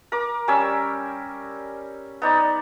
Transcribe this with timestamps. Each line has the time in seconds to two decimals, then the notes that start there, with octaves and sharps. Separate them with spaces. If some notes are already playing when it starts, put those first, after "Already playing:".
0.12 A#4 D6
0.48 G3 C#4 G#5 E6
2.22 B3 D#4 D5